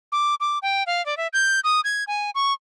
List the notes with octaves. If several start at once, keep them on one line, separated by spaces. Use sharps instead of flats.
D6
D6
G5
F5
D5
E5
G6
D#6
G#6
G#5
C#6